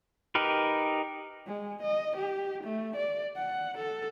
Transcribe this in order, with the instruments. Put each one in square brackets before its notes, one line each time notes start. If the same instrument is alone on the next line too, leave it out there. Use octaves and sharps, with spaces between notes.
[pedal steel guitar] D#4 G4 A#4 B4
[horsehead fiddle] G#3
D#5
G4
A3
D5
F#5
A4